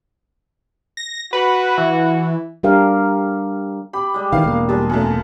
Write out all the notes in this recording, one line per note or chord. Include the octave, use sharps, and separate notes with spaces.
A#6
F#4 B4
E3
G3 D4 G4 A#4 F5
G4 B5
G3 G#3
D#3 E3 F5
E1 A#3
G3 G#3 F4 A5
F#2 A3 A#4